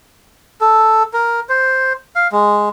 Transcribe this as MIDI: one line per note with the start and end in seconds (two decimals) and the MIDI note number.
0.61 1.03 69
1.13 1.40 70
1.49 1.93 72
2.16 2.28 77
2.32 2.69 56